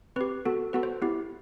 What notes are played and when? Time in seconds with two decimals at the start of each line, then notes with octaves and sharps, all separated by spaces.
0.16 C4 G4 B4
0.45 B3 F#4 A4
0.73 B3 F#4 A4 B4
0.83 C5
1.02 B3 E4 G4